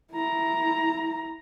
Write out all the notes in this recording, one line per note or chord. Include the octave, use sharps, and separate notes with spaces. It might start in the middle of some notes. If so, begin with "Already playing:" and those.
E4 A#5